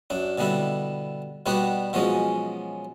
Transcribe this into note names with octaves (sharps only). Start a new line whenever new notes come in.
F#2 D4
B2 D3 G3 D4 E4
B2 G3 B3 D4 F#4 G4
B2 F3 F#3 G#3 C#4